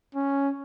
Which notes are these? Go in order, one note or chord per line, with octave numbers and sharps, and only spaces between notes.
C#4